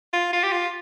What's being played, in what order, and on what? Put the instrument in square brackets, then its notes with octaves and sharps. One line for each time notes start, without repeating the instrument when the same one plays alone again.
[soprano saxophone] F4
F4
G4
F4